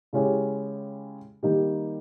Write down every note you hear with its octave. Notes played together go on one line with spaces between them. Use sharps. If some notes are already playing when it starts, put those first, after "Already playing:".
C#3 G#3 C#4 E4 G4
D#3 G3 A#3 D#4 G4